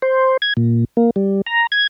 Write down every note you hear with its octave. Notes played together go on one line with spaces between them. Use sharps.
C5
G#6
A#2
A#3
G3
A#5
G#6